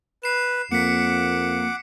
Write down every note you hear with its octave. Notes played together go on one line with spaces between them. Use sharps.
B4 C7 E7
F2 A#3 F#5 D6 B6 C#7